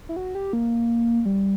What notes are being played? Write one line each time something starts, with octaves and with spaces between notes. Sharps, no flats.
E4
F#4
G4
A#3
G3